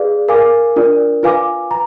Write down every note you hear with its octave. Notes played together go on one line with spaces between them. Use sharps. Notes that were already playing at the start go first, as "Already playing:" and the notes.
Already playing: G#4 B4 D5 F5
A#4 F5 G#5 D6
D4 F4 A#4 D5
F4 B4 F5 G#5 D6
A#5